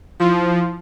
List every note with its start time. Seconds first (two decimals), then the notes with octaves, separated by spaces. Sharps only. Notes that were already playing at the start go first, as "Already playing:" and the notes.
0.20 F3 E4 C6